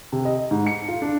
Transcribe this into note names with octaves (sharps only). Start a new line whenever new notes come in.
C3
D#5
G#2
C#7
F4
D4